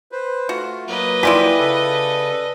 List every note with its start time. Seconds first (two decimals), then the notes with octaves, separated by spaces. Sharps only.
0.12 B4 C5
0.49 A3 F4 F#4
0.88 F#3 A#3 B4 D#5
1.23 E4 F4 G4 D5 G#5 B6
1.58 C#3 A4